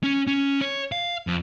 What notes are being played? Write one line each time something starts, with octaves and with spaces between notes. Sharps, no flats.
C#4
C#4
C#5
F5
F2